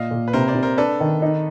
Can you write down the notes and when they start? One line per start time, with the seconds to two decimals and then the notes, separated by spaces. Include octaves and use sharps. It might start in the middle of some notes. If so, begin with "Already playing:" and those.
Already playing: A#2 D#5 F5
0.11 A#2
0.28 B4
0.33 C3 A#4 C5
0.48 C5 D5
0.55 C3
0.63 A#4 C5
0.78 D4 A4 B4
1.00 D#3
1.22 D#4